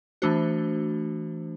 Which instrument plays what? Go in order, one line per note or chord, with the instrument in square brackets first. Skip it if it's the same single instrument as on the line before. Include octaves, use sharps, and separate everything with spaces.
[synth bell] E3 A3 D4 F#4 C5